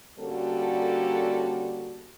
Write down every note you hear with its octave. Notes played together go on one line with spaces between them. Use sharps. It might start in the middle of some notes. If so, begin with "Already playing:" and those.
D3 G3 A#3 C#4 F#4 A4